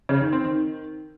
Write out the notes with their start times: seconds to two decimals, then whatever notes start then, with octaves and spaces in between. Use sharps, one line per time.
0.09 C#3
0.21 D#3
0.32 C4
0.44 D#3